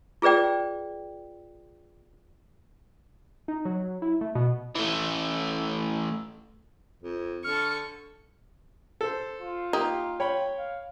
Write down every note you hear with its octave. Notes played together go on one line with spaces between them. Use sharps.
F4 G#4 B4 D5 G5
D#4
F#3
E4
A3
B2
E3 A3
F2
D3 A4 C#6 F6
A4 C5
F4
A#3 D#4 G4
C#5 G5 B5
F5